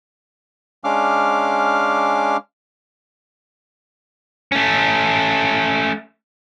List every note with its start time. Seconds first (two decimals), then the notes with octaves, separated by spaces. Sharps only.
0.84 G#3 C#4 D4 F5 D6 F6
4.52 A3 C#4